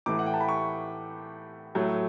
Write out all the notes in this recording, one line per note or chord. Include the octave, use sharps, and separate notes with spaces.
A2 E3 A3 D6
F#5
G5
A5
B5
C#6
A2 F#3 A3